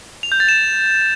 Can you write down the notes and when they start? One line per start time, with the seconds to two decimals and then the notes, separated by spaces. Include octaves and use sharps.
0.23 F7
0.32 G6
0.40 A6
0.49 E7